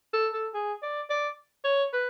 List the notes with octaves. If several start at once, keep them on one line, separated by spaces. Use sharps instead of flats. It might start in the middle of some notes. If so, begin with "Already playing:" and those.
A4
A4
G#4
D5
D5
C#5
B4